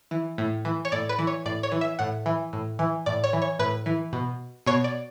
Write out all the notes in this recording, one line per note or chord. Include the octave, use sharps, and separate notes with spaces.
E3
A2
E3
C#5
A2 D5
B4
E3
C#5
A2 D5
C#5
E3
E5
A2 F#5
E3
A2
E3
A2 D5
C#5
E3
C#5
A2 B4
E3
B2
B2 C#5
D5